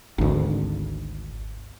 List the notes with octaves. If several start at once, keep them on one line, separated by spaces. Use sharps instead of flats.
G#1 D2